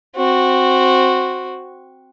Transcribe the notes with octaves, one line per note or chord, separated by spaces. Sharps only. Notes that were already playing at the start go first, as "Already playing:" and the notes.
C4 F#4